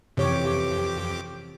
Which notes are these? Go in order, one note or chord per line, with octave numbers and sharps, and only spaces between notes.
F2 C3 E3 G4 C#5 D6